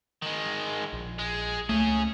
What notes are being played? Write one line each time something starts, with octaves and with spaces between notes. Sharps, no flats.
D#3 G#3
A#1
G#3
C#2 A3 C#4 G#4